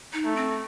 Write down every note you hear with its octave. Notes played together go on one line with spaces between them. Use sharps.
D#4
A3
C4